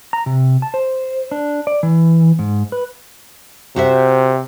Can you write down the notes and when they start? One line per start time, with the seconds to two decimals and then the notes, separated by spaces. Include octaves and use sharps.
0.13 A#5
0.26 C3
0.62 A5
0.74 C5
1.32 D4
1.67 D5
1.83 E3
2.39 G#2
2.72 B4
3.76 C3 F#4 C5 E5